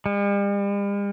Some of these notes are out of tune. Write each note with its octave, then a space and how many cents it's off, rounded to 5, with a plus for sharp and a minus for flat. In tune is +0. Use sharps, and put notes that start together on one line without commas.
G3 +45